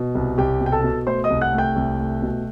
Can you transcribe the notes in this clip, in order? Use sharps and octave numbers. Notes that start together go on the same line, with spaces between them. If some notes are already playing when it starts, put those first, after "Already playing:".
Already playing: B2
C2
C2 G4 G5
B2
G5
A4 A5
B2
A3 C5 C6
D#5 D#6
C2
F#5 F#6
A3
G5 G6
C2
A3
B2